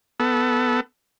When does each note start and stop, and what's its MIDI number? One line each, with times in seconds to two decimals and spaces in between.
0.20 0.80 59
0.20 0.80 69